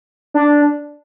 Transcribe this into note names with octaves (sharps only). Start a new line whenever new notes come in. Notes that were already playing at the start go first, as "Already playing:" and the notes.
D4